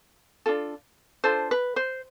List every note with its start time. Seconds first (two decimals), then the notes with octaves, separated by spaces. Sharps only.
0.46 D4 F4 A4
1.24 D4 F4 A4 C5
1.51 B4
1.76 C5